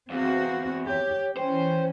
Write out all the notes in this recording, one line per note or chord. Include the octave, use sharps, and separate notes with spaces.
E2 C4 F#4 F5
G4 C#5
E3 C#4 C5 G5